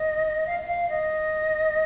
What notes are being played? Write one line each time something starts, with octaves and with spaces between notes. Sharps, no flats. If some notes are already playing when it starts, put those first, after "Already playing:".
Already playing: D#5
F5
F5
D#5